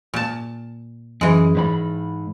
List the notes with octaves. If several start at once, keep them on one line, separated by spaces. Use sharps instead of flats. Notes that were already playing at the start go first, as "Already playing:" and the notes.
A#2 A5
F#2 E3 G#3
G#2 C5 B5